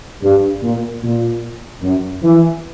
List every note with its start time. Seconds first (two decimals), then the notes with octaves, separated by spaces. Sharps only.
0.22 G2
0.63 A#2
1.03 A#2
1.82 F#2
2.23 E3